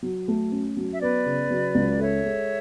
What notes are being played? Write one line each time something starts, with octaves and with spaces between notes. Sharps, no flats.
F#3
A3
C#4
F#3
E5
B3 B4 D5
C#3
F#3
C#2
A4 C#5 E5
G#3